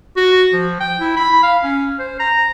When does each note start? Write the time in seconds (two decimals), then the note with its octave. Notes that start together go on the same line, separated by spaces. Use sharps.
0.17 F#4
0.53 F3
0.80 G5
1.00 E4
1.16 B5
1.43 F5
1.63 C#4
1.99 C5
2.19 A#5